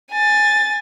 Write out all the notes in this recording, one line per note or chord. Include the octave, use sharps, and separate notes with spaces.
G#5 A6